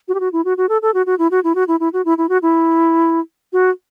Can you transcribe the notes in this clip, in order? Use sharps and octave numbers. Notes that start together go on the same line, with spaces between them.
F#4
G4
F#4
E4
F#4
F#4
A4
A4
F#4
F#4
E4
F#4
E4
F#4
E4
E4
F#4
E4
E4
F#4
E4
F#4